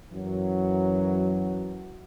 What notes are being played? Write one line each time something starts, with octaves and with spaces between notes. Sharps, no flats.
F#2 E3 F#3